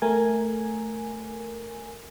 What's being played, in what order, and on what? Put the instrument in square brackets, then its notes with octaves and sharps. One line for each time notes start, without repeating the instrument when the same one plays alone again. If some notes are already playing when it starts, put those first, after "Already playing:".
[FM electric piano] A3 A#4 G#5